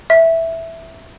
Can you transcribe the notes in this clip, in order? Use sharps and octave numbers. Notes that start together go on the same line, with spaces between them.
E5